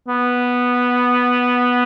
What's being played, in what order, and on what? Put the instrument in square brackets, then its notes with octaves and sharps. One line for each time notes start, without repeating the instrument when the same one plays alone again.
[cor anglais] B3